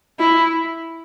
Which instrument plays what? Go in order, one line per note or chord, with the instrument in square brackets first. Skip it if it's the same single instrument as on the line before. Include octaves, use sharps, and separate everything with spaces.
[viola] E4